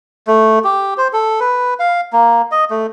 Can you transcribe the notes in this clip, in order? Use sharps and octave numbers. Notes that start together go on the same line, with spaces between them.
A3
G4
C5
A4
B4
F5
A#3
D#5
A3